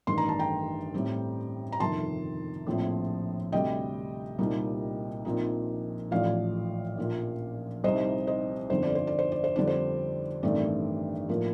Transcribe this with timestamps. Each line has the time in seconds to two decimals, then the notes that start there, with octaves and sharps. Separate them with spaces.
0.07 A1 G2 D#3 C6
0.18 A#5
0.29 A5
0.39 G5 A#5
0.94 A2 G3 C4
1.72 A#5
1.80 G1 F2 C3 D#3 A5 C6
2.67 A#1 A2 F3 C4
3.52 D2 C3 G3 D#5 G5
4.38 C2 A#2 G3 C4 D#4
5.25 A#1 A#2 F3 C4 D#4
6.11 A1 A2 F3 D5 F5
6.98 A#1 A#2 F3
7.84 C2 C3 G3 C4 D#4 C5 D#5
8.27 C5 D#5
8.70 G1 F2 D3 C5
8.83 D5
8.95 C5
9.07 D5
9.19 C5
9.32 D5
9.44 C5
9.56 F2 D3 G3 D4 D5
9.67 C5
10.43 A1 G2 D#3 A3 C4 D5
11.29 A2 F3 A#3